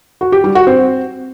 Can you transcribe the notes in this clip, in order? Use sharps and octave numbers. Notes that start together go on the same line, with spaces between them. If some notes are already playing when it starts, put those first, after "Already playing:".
F#4
G4
G3
F#4
C4